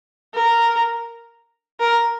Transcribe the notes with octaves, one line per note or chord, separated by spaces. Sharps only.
A#4
A#4